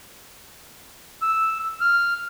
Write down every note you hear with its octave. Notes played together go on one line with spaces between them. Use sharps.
E6
F6